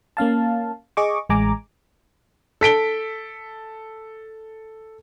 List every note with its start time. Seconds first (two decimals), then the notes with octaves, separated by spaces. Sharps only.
0.17 A#3 C#4 F5 A5
0.97 G#4 D#5 C#6 D6
1.29 A1 G#3 G#5 A#5 D6
2.61 A4 B6 D7 G7